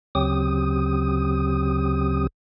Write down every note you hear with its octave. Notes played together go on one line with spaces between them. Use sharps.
D2 C#3 F#3 C4 G4 D#6